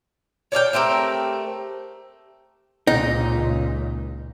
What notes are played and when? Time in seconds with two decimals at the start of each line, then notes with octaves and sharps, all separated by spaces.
0.52 C#5 D5 F5 G5
0.73 A3 C4 G4 A#4
2.87 C#2 A#2 D#4